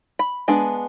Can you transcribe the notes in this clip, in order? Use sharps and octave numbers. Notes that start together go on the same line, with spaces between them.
B5
G#3 B3 D4 G#5